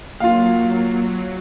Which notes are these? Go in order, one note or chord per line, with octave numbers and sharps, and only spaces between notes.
F#3 A#3 F4 F5